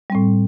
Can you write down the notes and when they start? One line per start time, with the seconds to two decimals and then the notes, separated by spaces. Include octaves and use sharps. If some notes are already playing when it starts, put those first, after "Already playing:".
0.10 G3
0.12 C4
0.15 A2